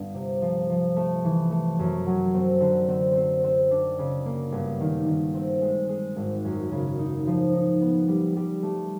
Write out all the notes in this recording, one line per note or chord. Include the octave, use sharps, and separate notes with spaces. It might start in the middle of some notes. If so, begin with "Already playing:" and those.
Already playing: G1
C3
F3
F3
A3
E3
A3
F#2
F#3
C4
D3
C4
C4
C4
D4
C#3
A#3
G1
D#3
D#3
C4
G#3
G#3
G#1
F#2
C#3
D#4
F3
D#4
B3
G3
G3
A3